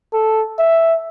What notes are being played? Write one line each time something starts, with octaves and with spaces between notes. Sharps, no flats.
A4
E5